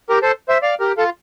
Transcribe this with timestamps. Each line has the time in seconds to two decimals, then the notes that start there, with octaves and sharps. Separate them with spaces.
0.09 G4 A#4
0.22 A4 C5
0.49 C5 E5
0.62 D5 F5
0.80 G4 A#4
0.97 F4 A4